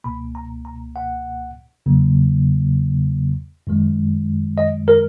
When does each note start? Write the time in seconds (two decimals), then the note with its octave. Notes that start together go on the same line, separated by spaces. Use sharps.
0.04 C#2 B2 A#3 B5
0.35 A#5
0.65 A#5
0.96 F#5
1.86 E2 C#3 F#3 A#3
3.67 F#2 D#3 G#3
4.58 D#5
4.88 A#4